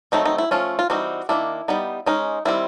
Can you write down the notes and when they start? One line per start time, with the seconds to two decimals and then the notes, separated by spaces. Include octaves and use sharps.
0.12 D#3 F#3 A3 C4 D#4
0.25 D#4
0.38 E4
0.51 F3 A3 C#4 F4
0.79 F4
0.90 E3 G3 C4 D#4 F#4
1.29 D#3 F#3 A#3 D4 E4
1.68 G3 B3 D#4
2.06 G#3 C#4 D#4
2.45 D#3 G3 C4 E4